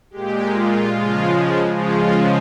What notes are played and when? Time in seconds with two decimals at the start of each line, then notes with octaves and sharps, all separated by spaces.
0.11 A#2 G#3 G4
0.52 F4
0.93 C#3 F3 G#3 F4
1.75 C#3 F3 G#3 F4